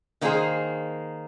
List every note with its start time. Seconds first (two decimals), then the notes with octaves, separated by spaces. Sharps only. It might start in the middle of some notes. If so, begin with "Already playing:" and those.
0.21 D#3 A#3 C#4 G#4 C5